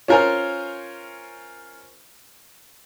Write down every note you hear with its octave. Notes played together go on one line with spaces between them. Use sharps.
C#4 F4 A#4 C5 G#5